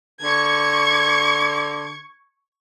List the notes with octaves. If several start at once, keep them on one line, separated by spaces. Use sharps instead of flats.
D3 C#6 G#6